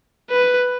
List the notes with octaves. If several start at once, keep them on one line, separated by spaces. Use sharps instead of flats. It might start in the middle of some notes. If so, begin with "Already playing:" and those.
B4